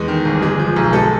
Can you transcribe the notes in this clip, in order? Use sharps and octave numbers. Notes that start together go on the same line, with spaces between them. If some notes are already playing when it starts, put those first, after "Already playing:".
Already playing: E2 G#3
D#3
G1
G#3
F3
B1
G#3 A4